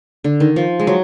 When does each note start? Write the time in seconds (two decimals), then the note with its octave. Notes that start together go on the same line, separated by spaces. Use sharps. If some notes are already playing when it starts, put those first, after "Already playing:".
0.24 D3
0.40 D#3
0.56 F3
0.80 G#3
0.87 F#3